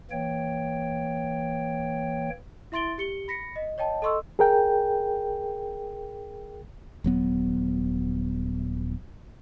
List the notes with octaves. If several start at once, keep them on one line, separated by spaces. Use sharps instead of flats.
E3 A#3 C#5 G5
E4 E5 C6 A6 D7 G7
G4 C#7 G7
B5 A#6 B6 C#7
D#5
C#5 D#5 G5 A5
A4 D#5 C6 C#6 E6
G#4 A#4 G5
D#1 F#3 B3